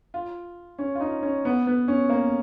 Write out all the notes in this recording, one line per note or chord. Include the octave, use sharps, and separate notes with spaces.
F4
C#4
F4
D#4
C#4
B3
B3
C#4
A#3